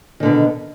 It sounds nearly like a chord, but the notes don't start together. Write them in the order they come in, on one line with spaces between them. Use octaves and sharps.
D#3 D3 B2